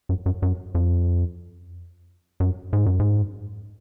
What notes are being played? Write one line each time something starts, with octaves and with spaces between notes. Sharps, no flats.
F#2
F#2
F#2
F2
F#2
G#2
F#2
G#2